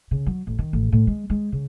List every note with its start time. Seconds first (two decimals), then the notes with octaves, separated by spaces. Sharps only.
0.11 C#3
0.26 F#3
0.47 A1
0.59 D#3
0.73 A1
0.92 A2
1.07 G#3
1.30 G#3
1.52 C#3